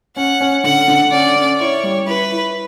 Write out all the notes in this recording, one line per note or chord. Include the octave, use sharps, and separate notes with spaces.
C#4 F#5
C#4
D3 F#5
D3
C#4 D5
C#4
E4 C#5
G3
E4 B4
E4